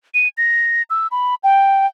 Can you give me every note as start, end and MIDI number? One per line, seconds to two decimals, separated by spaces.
0.14 0.28 99
0.38 0.82 94
0.90 1.07 88
1.11 1.35 83
1.44 1.86 79